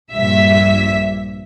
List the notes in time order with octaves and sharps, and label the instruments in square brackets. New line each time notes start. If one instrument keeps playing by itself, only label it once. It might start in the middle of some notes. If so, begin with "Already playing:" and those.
[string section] A#1 G2 E5 B6